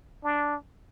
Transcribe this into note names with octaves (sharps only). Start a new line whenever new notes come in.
D4